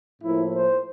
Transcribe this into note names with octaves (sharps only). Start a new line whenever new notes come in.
A2 F3 A#3 E4
C5